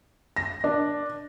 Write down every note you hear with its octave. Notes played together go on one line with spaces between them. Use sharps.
A#6
D4